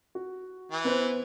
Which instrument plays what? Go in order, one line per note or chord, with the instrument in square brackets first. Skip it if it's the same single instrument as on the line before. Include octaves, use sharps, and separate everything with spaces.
[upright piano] F#4
[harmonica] E3
[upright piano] B3 B4 C5